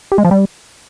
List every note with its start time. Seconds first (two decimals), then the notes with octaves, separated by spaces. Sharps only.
0.12 G4
0.18 G#3
0.25 F3
0.31 G3